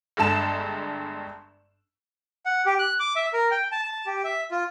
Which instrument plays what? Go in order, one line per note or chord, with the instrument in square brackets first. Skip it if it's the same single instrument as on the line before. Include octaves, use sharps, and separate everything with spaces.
[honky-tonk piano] G1 G2 G#3 A4 A5 E7
[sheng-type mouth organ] F#5
G4
F#6
D6
E5
A#4
G5
A5
A5
G4
E5
F4